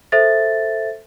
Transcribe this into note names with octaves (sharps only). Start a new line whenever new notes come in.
A4 C5 E5 A6